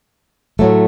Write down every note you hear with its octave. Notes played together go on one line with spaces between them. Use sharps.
A2 F#3 A3